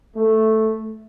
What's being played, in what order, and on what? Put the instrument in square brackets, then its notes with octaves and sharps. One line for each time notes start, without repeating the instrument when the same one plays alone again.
[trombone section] A3